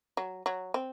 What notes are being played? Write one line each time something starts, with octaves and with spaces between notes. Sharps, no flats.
F#3
F#3
C4